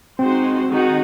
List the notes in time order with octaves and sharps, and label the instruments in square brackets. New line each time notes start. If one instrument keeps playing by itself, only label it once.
[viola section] G#3 D#4 F#4 C5 [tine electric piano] C4
[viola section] D#3 G#3 D#4 F#4